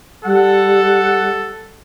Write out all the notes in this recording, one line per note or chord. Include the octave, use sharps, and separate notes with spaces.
G3 A4 F#5